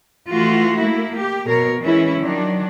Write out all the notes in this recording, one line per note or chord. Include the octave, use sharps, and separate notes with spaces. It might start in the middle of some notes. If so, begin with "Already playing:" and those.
E3 A3 F4 F#4
A3 A#3 E4
G4
B2 A#4 C#5
E3 G#3 C#4 E4
D#3 F#3 D4